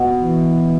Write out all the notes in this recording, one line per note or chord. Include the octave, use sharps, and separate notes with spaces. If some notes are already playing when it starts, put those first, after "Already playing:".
Already playing: B2
E3